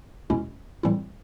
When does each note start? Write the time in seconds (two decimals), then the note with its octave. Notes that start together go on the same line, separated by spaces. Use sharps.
0.30 E2 B2 G#3 C#4 E4
0.83 A2 E3 G3 C4 E4